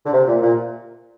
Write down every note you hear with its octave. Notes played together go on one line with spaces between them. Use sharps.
D3
C3
A#2
A#2